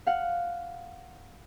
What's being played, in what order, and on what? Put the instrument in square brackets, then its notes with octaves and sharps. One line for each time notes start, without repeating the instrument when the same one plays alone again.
[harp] F5 F#5